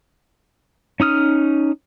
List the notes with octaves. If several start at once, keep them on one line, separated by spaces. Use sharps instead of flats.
C#4 D#4 D#6 F6